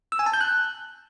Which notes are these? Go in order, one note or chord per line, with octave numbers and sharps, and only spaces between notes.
E6
G#5
A5
G6
F#6